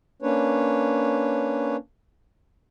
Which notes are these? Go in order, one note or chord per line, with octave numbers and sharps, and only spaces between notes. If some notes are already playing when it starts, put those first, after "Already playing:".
A#3 C#4 D4 B4 C#5